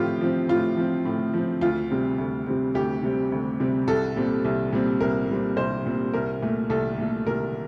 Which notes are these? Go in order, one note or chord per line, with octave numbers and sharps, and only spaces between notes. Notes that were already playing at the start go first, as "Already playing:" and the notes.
Already playing: A2 F3 C4 F4 G4
F3 C4
A2 F4
F3 C4
A2
F3 C4
D2 F4
C3 G3 C4
D2
C3 G3 C4
D2 G4
C3 G3 C4
D2
C3 G3 C4
C2 A4
A#2 G3 C4
C2
A#2 G3 C4
C2 A#4
A#2 G3 C4
C2 C5
A#2 G3 C4
C2 A#4
A#2 A3
C2 A4
A#2 A3
C2 A#4